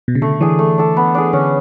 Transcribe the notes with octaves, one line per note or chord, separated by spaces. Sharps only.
B2
C#3
D3 A3
E3 D4 G#4
A3
D4 A4
B3
D4 G#4
D3 C#4